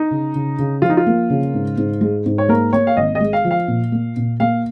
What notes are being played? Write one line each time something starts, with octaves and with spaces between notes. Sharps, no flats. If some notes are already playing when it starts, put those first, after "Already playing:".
Already playing: D#4
C#3
C#3
C#3
F3 F4
D#4
F4
A#3
C#3
G#2
G#2
G#3
G#2
C#5
A#3 A#4
A#3 C#5
F5
G#1 D#5
D#5
G#3
F5
F3
F5
A#2
A#3
A#2
A#3 F5